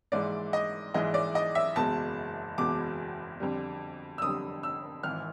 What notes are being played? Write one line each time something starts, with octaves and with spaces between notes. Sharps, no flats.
A#1 G#2 E3 G#3 D5
D#5
A#1 G#2 E3 G#3 D#5
D5
D#5
E5
F#1 E2 B2 G#3 A5
F#1 E2 B2 G#3 D6
F2 D3 G3
E6
F2 D3 G3 D#6
E6
G#1 G#2 E3 F6